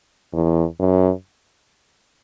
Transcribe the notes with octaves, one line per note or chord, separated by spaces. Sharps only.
E2
F#2